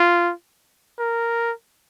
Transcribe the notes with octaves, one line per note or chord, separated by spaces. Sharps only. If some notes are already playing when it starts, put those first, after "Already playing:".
Already playing: F4
A#4